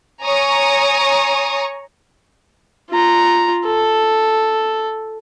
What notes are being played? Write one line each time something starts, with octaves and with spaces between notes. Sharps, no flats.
C#5 G#5 A#5 C#6 D#6
F4 A#5
A4